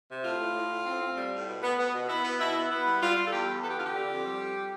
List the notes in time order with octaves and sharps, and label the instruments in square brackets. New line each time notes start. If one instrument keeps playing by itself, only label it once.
[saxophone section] C3
A2 F4
A2
A2
A2
C4
C4
G3
A2
B2
B3
B3
B2
B3 E4
B3
B2 E4
B3
B3 E4
G3
G3 F4
G3
A4
E2 G4
E2
B3 A4
G4
D3 F4
G4
D3
F2
G3
F2